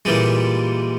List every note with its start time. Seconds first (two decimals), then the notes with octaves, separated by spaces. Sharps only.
0.05 A#2 E3 G3 G#3